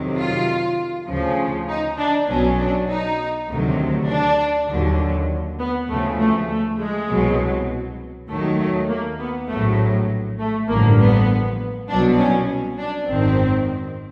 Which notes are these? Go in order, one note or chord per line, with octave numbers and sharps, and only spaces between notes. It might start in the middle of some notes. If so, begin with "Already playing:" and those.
Already playing: F2 C3 D#3 F#3
F4
D2 C#3 F3
D#4
D4
B1 B2 F#3 C#4
D4
D#4
D2 C3 D#3 F#3
D4
D#2 D3 F#3
B3
D2 C#3 F3 A3
A3
A3
G#3
C2 B2 F#3
D#2 D#3 F#3 A3
A3
A#3
B3
A#1 A2 F#3 A3
A3
A1 G2 D3 F3 A#3
B3
C2 B2 F#3 D4
C#4
D4
G#1 F#2 D#3 C4